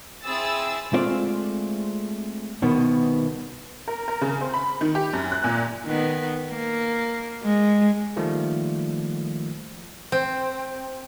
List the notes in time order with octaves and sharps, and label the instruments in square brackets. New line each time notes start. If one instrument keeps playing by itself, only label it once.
[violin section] C4 E4 G#4 B5 E6 A6
[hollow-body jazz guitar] G#3 A3 C4 F4 D5 F5
C2 B2 D#3 B3
[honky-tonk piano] A#4
A#4
C#3
C4
B5
D#3
G4
F#2
F#6
A#2
[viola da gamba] D#3 B3
A#3
G#3
[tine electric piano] D#3 F3 G3 A3 A#3
[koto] C4